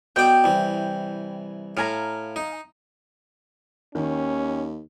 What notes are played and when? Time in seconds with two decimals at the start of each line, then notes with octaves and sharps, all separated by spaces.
0.16 B2 D5 G5
0.44 C2 E3
1.77 A2 F5 G#5 A#5
2.36 D#4
3.95 D#2 D#3 C#4